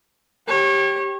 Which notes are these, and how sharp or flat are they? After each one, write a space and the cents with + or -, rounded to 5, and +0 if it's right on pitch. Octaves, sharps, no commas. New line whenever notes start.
G4 +0 C#5 -30